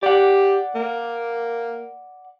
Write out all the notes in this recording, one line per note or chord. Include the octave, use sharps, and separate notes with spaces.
G4 D5 F#5
A#3